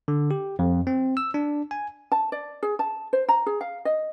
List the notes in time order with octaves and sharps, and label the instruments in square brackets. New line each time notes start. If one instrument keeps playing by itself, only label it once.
[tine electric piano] D3
G4
F2
C4
E6
D4
G#5
[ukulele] A5
D5
G#4
A5
C5
A#5
G#4
F5
D#5